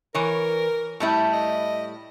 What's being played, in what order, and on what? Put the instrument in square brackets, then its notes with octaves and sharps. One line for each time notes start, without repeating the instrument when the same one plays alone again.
[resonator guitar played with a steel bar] E3 C#5 [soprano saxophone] A#4
[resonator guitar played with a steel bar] A2 G3 E4
[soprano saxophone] D#5